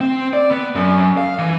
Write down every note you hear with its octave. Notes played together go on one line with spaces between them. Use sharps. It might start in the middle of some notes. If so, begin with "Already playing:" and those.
C4
D5
B3
F#2
F5
E3